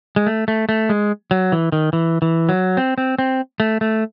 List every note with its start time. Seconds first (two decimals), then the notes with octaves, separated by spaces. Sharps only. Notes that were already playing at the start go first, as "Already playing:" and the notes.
0.16 G#3
0.26 A3
0.48 A3
0.69 A3
0.89 G#3
1.31 F#3
1.52 E3
1.72 D#3
1.93 E3
2.22 E3
2.49 F#3
2.77 C4
2.98 C4
3.19 C4
3.60 A3
3.81 A3